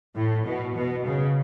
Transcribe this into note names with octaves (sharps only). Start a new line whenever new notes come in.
A2
B2
B2
C#3